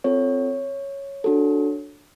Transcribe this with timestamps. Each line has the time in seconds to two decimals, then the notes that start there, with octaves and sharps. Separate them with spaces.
0.04 C4 F4 A4 C#5
1.24 D4 F#4 A4